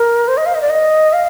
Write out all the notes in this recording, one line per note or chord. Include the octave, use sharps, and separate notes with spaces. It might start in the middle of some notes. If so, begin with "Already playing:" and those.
Already playing: A#4
C5
D#5
F5
D#5
D5
D#5
F5